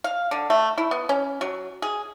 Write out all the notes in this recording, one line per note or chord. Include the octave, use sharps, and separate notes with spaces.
F5
D3
A3
E4
B3
C#4
F#3
G#4